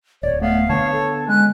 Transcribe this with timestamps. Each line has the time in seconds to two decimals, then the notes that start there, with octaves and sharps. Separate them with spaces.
0.23 D1 C#5 D5
0.42 A3 B3 F5
0.69 D3 B3 C#5 A5
0.92 A4
1.28 G#3 C#4 F#6